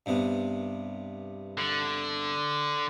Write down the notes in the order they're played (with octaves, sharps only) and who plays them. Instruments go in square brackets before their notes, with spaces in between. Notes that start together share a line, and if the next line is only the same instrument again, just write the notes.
[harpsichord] G2 C3 B3
[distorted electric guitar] D3